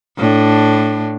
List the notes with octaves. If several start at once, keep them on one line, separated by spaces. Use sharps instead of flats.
A2 D4